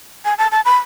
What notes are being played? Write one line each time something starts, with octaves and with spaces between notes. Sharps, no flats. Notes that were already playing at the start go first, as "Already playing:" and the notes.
G#5
A5
A5
B5